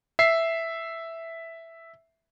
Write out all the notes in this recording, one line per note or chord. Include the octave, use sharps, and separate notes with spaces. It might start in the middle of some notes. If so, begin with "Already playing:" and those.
E5 C7